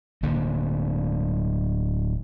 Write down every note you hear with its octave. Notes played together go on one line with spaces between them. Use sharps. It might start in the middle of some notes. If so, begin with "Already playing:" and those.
D1 D3 A#3